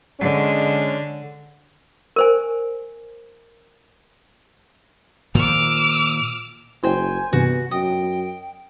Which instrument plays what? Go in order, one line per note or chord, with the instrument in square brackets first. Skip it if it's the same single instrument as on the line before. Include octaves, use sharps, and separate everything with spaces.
[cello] D3 [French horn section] G#3 C#4
[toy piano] A#4 C5 G#5
[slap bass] A#2 D#3 F3 [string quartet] D6 E6 F6
[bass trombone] F#1 [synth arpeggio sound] E4 [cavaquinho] C5 G5 [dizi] G#5
[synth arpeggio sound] G2 C3 E3 [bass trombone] B3 [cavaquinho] F#4
[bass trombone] F#2 [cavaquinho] D#5 [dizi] G5